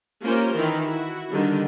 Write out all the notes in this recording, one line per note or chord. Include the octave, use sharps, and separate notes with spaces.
A#3 C#4 F4 G4 A#4 C5
D#3 E3 E4 F4
E4 F#4
D3 D#3 G3